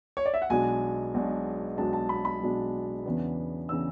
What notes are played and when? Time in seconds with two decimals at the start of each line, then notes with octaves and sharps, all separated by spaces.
0.17 C#5
0.26 D5
0.34 E5
0.42 F#5
0.50 B1 B2 G#3 D4 G#5
1.14 B1 B2 G#3 D4
1.77 B1 B2 G#3 D4 A5
1.93 A5
2.09 B5
2.25 B5
2.41 B1 B2 G#3 D4
3.06 E2 C#3 E3 B3 D4
3.69 C#3 E3 B3 D4 E6